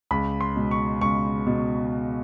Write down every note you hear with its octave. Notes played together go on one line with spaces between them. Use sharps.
C#2 B5
C6
B2 G#3
C#6
C#2 C#6
B2